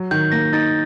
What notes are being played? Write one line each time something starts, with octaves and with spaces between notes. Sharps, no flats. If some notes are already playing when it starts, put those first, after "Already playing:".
Already playing: F#3
D#3 G6
A#3 A#6
D#4 A6